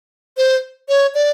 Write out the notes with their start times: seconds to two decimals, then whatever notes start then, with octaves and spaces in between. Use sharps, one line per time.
0.37 C5
0.89 C#5
1.14 D5